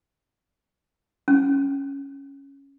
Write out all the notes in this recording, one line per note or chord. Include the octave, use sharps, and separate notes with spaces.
C#4